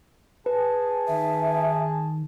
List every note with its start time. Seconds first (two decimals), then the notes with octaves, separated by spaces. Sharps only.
0.46 G#4 B4 A5
1.08 D#3 E5